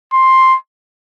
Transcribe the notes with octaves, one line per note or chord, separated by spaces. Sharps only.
C6